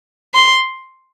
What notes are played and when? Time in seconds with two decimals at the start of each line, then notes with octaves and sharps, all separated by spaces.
0.34 C6